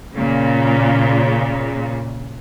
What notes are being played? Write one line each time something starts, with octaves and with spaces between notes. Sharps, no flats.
A#2 C#3